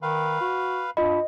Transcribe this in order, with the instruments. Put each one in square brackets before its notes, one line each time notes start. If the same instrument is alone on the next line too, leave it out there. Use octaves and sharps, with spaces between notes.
[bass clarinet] D#3 [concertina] B4 F5
[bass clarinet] F#4
[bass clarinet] G2 [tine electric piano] F4 B5 [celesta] D#5